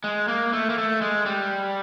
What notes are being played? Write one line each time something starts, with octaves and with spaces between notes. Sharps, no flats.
G#3
A#3
A3
A#3
A3
G#3
G3